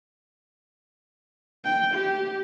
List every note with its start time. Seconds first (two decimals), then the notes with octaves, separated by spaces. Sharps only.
1.65 G5
1.94 G4